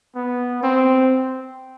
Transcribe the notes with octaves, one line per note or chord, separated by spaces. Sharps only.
B3
C4